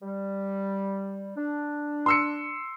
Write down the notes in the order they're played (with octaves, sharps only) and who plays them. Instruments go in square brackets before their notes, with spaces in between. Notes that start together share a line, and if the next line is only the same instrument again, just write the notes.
[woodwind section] G3
D4
[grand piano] C6 E6 C#7